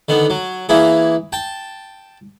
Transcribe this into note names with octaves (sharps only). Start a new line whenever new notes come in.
D3 D#3 B3
F#3
E3 A#3 E4 G#4
G5 A5